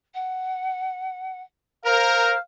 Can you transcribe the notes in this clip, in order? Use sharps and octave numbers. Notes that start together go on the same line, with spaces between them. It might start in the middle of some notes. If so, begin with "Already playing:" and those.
F#5
A#4 C5 F5